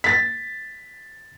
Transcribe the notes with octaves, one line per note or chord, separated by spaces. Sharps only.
A6 B6